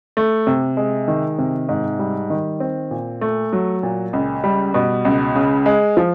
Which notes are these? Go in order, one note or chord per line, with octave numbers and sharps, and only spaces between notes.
A3
C3
G#3
D#3
C3
G#2
G3
D#3
C4
A#2
A3
F#3
A#2
C#2
G3
B2
C#2
C#3
G#3
F3